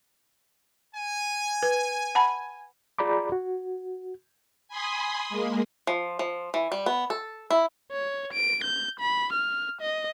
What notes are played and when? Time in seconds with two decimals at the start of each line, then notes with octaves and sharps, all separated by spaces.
0.95 G#5
1.63 B4
2.15 F#5 A5 B5
2.99 F4 G#4 D5 A#5 B5 D6
3.32 F#4
4.68 G#5 B5 C6 D#6
5.29 G#3 A#3
5.87 F3
6.19 F3
6.54 E3
6.72 G3
6.86 B3
7.10 A4
7.50 E4
7.92 C#5
8.33 D7
8.64 G6
9.00 B5
9.33 F6
9.82 D#5